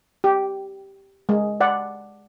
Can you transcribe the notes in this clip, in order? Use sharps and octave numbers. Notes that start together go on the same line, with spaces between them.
G4
G#3
D5 F#5